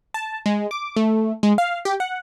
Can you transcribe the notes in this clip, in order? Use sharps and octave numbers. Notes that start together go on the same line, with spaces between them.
A5
G#3
D6
A3
G#3
F5
G4
F#5